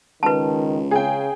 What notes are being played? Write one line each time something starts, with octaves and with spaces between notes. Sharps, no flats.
C#2 D#3 B4 A5
C#3 G#4 G5